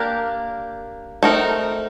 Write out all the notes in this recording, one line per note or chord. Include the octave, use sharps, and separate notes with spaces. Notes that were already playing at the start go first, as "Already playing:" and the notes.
Already playing: A#3 D4 G4 A#4
A3 C4 D#4 A#4